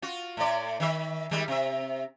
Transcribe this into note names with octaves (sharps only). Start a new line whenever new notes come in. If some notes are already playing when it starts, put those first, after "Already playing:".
F4 F#4
A2 D5
D#3 E5
D#3 G3 G#3
C3 E5